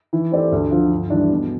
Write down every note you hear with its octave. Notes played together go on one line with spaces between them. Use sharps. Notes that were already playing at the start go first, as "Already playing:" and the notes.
E3
A3 C4 G4 D5
D2
D3 F3 C4 F4
G2
E3 G3 D4
B2